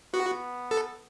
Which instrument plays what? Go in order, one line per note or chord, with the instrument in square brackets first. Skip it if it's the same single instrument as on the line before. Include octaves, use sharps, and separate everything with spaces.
[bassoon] B3 [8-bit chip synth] F#4
[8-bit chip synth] A4